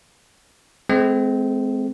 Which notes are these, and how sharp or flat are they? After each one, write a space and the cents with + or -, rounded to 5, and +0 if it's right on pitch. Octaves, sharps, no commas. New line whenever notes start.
G#3 +30 C4 -20 A4 +0